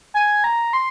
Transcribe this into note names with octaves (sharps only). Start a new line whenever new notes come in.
G#5
A#5
C6